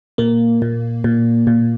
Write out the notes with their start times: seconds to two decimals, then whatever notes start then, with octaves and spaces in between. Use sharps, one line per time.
0.18 A#2 A#3
0.62 A#2
1.04 A#2
1.47 A#2